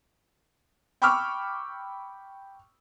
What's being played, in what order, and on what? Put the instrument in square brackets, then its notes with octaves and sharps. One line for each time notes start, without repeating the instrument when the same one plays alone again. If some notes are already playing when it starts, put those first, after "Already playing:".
[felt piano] G5 B5 C#6 D6 E6 F6